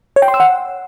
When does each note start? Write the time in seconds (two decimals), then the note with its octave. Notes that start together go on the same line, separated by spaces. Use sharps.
0.16 C#5
0.22 G5
0.28 C6
0.34 E6
0.40 F#5